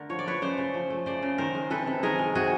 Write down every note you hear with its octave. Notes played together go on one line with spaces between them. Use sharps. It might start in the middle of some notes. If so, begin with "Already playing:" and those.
Already playing: D3 A3 A#4
F3 C#5
D5
A3 B4 C#5
C#3 C5 D5
C#3
F3
A3
C#3 C5 D5
C#3
D#3 A#4 C5
G#3
C3 A4 B4
C3
D#3 G#4 A#4
G#3
C3 F#4 G#4